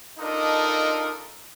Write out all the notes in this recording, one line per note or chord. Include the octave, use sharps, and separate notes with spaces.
D4 D#4 F4 A4 A#4 D#5